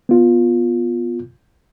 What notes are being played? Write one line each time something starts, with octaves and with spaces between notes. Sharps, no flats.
B3 F4